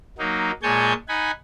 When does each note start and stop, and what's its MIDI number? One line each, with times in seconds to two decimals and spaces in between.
0.18 0.51 54
0.18 0.51 58
0.18 0.51 63
0.63 0.93 46
0.63 0.93 56
0.63 0.93 73
0.63 0.93 80
0.63 0.93 81
0.63 0.93 91
1.09 1.31 63
1.09 1.31 78
1.09 1.31 80
1.09 1.31 83